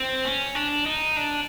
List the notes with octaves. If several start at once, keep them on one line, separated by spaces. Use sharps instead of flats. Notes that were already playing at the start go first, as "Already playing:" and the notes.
Already playing: C4
C#4
D4
D#4
D4